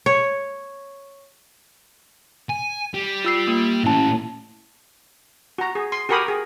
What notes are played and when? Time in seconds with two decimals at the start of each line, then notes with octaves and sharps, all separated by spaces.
0.06 C#5
2.50 G#5
2.94 G3
3.24 F4 E6 C7
3.48 A#3
3.84 A2 C#4 E4 A5
5.58 F#4 A#5
5.75 G#4
5.92 C6
6.09 F#4 G4 A#4 G#5 B5 D#6
6.28 G#4